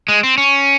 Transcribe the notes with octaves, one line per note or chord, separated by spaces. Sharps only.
G#3
C4
C#4